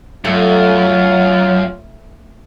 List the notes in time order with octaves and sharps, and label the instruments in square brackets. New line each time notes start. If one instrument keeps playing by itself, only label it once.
[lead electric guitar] F#2 [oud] A3 [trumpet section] F4 C#5